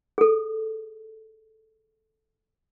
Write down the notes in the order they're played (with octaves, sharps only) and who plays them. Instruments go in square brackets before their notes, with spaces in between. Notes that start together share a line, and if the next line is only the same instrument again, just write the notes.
[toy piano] G#4 A4